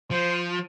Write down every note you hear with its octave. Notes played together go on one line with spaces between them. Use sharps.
F3 C5